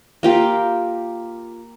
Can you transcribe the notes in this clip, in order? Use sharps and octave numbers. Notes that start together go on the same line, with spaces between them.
A#3 F4 G4